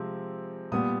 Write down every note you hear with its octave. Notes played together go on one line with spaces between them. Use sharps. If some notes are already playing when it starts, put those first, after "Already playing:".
Already playing: C3 F3 G#3 C4
A#2 G3 B3 D#6